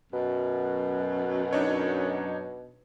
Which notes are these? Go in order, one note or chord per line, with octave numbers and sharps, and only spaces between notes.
F#2 B2
D4 D#4 C#5